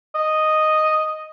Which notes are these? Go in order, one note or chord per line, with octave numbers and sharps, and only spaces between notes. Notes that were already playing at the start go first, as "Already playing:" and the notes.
D#5